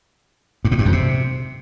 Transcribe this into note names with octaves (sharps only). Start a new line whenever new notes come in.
G2
A2
G2
F2
C3